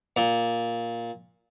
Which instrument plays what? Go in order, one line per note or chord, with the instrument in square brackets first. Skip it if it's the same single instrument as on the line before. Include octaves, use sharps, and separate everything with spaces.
[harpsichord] A#2